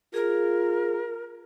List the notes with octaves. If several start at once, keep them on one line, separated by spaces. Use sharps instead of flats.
F4 G#4 A#4